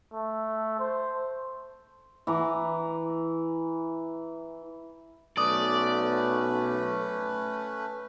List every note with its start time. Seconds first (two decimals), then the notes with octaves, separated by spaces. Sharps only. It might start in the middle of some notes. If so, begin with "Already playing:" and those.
0.13 A3
0.79 C5
2.27 E3 A#5 D6
5.38 B1 A3 C#4 B4 D5 D#6